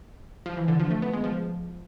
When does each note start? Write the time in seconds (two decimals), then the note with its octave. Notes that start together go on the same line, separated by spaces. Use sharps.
0.46 F3
0.57 E3
0.68 D3
0.80 F3
0.91 A3
1.02 B3
1.13 G#3
1.24 F3